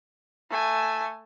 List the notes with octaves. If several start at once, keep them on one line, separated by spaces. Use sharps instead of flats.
A3 G#5